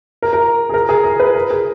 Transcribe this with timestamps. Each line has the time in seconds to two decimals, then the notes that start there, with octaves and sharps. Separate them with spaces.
0.23 A#4
0.33 A#4
0.69 G#4
0.74 A#4
0.89 G#4
1.04 A#4
1.20 B4
1.35 A#4
1.50 G#4